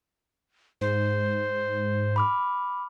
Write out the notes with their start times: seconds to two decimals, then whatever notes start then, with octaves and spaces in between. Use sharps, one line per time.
0.81 G#2 C5
2.16 B5 D6 F6